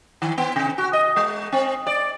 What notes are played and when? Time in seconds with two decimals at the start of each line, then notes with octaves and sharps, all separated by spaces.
0.22 D#3
0.38 B3
0.56 C3
0.78 F#4
0.93 D#5
1.16 G#3
1.52 C4
1.87 D5